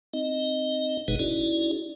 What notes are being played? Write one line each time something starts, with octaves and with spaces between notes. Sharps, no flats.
C4 D#4 D#5
F#1 B2 G#3 D#4 G#4 B4
C#4 D#4 E4 F#4 G#4 D5